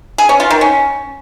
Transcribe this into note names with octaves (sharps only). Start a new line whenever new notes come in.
G#4
C#4
F4
D#3
C#4